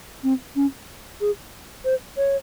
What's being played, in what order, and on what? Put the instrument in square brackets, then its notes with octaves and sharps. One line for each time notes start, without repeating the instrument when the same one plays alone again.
[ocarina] C4
C#4
G#4
C5
C#5